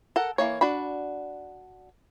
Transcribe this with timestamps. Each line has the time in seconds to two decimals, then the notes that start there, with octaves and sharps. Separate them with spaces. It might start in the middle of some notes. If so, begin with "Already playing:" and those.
0.16 A4 A#4 F#5
0.38 E3 A#3 C#5
0.61 D4 F#4 B5